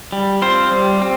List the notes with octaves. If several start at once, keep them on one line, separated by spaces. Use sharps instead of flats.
G3
C4 F4 C5
G3
C4